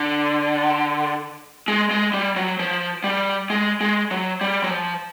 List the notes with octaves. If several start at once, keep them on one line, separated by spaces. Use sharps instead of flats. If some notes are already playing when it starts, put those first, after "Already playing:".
Already playing: D3
G#3
G#3
G3
F#3
F3
G3
G#3
G#3
F#3
G3
F#3
F3